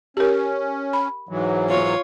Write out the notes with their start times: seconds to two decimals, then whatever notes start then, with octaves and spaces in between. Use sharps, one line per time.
0.17 C#4 G4 A#4
0.93 B5
1.29 G#2 E3 F#3
1.69 F4 C#5